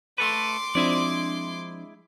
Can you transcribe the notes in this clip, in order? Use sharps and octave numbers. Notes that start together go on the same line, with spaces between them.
A3 A4 B4 C6 D6
F3 G#3 C4 D4 E4 D5